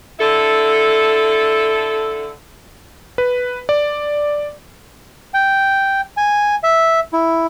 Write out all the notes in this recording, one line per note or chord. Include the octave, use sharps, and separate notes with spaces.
D3 E4 A4
B4
D5
G5
G#5
E5
E4